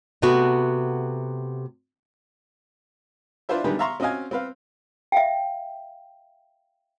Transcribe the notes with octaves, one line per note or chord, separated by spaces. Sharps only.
C3 A3 B3 F#4
D4 E4 F4 B4 C5 E5
D3 D#3 G3 G#3 G4 B4
E5 F5 A#5 C6 C#6
C4 C#4 F#4 D#5 F5 G#5
C4 B4 F5
E5 F5 G5